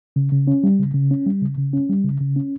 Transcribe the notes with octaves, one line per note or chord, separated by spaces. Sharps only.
C#3
C#3
C#4
G3
C#3
C#3
C#4
G3
C#3
C#3
C#4
G3
C#3
C#3
C#4